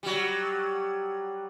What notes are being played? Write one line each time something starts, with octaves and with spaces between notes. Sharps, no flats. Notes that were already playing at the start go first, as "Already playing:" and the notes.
F#3 G3